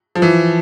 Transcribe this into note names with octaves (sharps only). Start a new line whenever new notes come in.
F3
E3